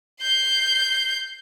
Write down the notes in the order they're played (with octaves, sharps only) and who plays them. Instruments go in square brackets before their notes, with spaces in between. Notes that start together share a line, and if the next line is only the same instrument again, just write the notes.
[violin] G6 C7